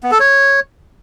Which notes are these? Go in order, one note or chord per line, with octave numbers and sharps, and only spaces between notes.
B3
A4
C#5